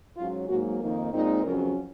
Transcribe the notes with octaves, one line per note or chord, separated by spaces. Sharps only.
G#2 F#3 C#4 F4
G#2 F#3 A#3 F#4
F2 D#3 A#3 D#4 A#4
A#2 G#3 C4 D#4
F2 C#3 F#3 C#4 A#4